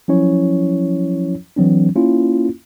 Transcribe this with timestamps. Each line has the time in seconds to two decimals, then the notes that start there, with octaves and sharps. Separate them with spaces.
0.08 F3 F#3 C#4 E4 C#5
1.56 E3 F#3 C4 D4
1.96 A#3 C#4 E4 F4